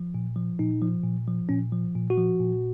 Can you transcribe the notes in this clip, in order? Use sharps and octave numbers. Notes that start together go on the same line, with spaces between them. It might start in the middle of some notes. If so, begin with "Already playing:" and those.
Already playing: F3
A#2
F3
A#2 D#4
F3
A#2
F3
A#2 C#4
F3
A#2
F#4
F3
A#2